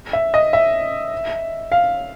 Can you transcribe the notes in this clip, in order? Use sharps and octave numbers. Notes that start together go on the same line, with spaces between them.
E5
D#5
E5
F5